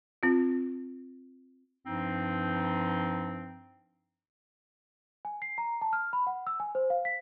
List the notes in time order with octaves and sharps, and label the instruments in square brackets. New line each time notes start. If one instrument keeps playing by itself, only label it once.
[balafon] C4 F4
[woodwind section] G2 F3 C4 D#4
[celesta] G#5
C7
A#5
A5
F6
B5
F#5
E6
G#5
C5
F5
B6